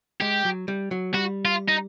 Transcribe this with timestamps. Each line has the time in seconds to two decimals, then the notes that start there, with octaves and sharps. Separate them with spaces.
0.21 G#3 G4
0.45 F#3
0.68 G3
0.91 F#3
1.14 G3 F#4
1.45 F4
1.68 D#4